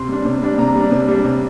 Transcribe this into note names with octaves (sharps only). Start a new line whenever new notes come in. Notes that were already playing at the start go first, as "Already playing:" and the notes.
Already playing: C3 C6
G3 D4
C3
G3 D4
C3 A#5
G3
D4
C3
G3 D4
C3